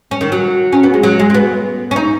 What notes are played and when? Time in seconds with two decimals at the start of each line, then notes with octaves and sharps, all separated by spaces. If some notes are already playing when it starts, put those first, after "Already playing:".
0.11 C#4
0.21 D#3
0.32 F#3
0.73 C#4
0.83 B3
0.94 G#3
1.03 F#3
1.20 G#3
1.30 G#3
1.34 B3
1.91 C#4
1.96 D#4